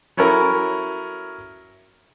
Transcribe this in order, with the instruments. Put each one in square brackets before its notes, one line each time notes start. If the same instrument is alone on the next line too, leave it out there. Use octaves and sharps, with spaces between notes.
[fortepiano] F#3 C#4 E4 A4 A#4